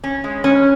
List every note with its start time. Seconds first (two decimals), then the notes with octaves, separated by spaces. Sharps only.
0.04 C#4
0.24 G#3
0.44 C#4